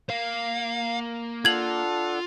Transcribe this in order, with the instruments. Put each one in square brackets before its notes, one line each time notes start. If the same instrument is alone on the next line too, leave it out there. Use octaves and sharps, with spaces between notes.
[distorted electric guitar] A#3 [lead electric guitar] F5
[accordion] D4 A4 F#5 [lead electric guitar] F4 [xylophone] G#6 F#7